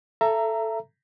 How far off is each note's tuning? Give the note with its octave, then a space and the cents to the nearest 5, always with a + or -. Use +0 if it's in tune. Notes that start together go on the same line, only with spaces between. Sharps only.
A4 +0 E5 +25 A#5 -10